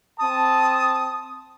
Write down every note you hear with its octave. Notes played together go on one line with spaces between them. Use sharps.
C4 A5 D#6